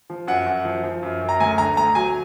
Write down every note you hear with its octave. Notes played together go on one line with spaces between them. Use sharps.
F3
F#2 F#5
F#2
F3
F3
F#2
F#2
A#5
D2 G#5
D3 A#5
D2 A#5
F#3 G#5